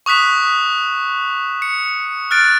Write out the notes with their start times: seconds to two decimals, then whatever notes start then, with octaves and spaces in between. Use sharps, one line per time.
0.06 C#6 D#6 F#6 B6 E7
1.62 C#7
2.31 F6 F#6 A6 D7